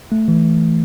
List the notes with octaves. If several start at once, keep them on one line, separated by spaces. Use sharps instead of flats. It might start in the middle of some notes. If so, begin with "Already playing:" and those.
A3
E3